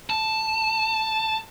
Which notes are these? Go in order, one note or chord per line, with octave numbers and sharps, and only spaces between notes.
A5